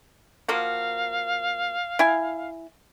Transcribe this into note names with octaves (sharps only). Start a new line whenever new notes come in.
F3 A#3 F#4 F5
E4 G#5